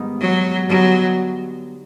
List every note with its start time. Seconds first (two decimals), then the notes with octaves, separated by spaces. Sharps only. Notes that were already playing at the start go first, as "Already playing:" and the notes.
Already playing: G#2 D#3 G3 B3 D#4
0.20 F#3
0.69 D3 F#3 G3 B3 D#4